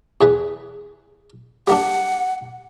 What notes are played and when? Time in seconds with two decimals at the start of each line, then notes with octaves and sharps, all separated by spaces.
0.21 E2 G#4 B4
1.68 G3 A#3 D4 F#5